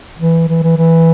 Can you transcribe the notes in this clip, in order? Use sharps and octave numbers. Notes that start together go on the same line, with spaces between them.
E3
E3
E3
E3